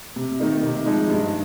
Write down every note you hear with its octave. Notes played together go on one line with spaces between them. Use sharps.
C3
D#3 A#3 D#4
C3
F3 G#3 D#4
G2